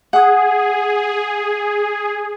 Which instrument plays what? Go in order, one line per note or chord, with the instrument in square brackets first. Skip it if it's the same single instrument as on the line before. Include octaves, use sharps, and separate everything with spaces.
[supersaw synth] G#4 [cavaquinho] F#5 D#6